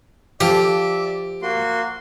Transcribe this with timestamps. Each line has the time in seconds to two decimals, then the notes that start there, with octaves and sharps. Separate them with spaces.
0.40 F3 G4 D5 E5
1.42 A#3 F#4 C6